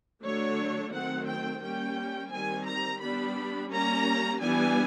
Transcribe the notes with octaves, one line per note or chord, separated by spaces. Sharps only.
D3 F#3 A3 D4 C#5
D#3 F#3 A3 C4 F#5
G5
G3 A#3 C#4 G5
D#3 G3 C4 G#5
A#5
G3 B3 D4 B5
G3 A#3 C#4 A#5
E3 G3 B3 D4 G#5